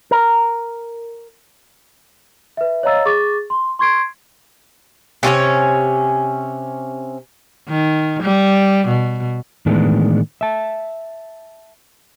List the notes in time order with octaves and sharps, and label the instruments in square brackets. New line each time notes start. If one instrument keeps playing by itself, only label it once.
[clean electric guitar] A#4
[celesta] B4 E5
C#5 D#5 F5 A#5 E6 A6
G#4 C#6 D6 A6
C6
C6 C#6 G#6 C7 D7
[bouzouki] C3 C#4 F4 C#5
[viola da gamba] D#3
G3
B2
[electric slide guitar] A2 D#3 E3 G#3 B3 D4
E5 A5